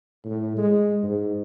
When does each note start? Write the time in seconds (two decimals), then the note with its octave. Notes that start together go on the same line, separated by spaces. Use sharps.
0.24 A2
0.57 G#3
1.03 G#2